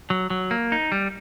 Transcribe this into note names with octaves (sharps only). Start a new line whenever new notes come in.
F#3
F#3
A#3
D#4
G3